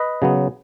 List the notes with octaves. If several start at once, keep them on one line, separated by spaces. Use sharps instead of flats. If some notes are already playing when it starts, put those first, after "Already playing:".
Already playing: B4 D#5
C#3 F#3 B3